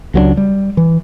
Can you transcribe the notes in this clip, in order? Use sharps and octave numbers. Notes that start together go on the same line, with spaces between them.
C#2 F#3 G#3 D4
G3
E3